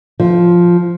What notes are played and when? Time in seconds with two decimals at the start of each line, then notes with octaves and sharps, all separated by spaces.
0.20 F3